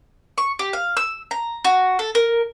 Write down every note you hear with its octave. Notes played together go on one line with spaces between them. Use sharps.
C#6
G4
F5
E6
A#5
F#4
A4
A#4